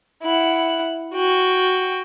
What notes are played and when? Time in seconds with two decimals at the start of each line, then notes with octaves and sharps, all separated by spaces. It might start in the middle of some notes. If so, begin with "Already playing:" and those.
0.23 E4 F#5
1.14 F#4 G5